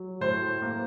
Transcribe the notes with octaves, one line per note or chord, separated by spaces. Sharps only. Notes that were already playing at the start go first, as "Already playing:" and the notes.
Already playing: F#3
A2 C5
A#3